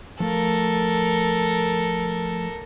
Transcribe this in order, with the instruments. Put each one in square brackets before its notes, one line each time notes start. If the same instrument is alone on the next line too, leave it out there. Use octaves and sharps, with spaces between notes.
[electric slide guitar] F3 A3 F5 [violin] A4 A#4